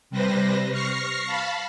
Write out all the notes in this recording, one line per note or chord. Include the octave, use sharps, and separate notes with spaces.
C3 G3 B4 C5 A#6
C#6 F6 A#6 C7
F5 A5 B5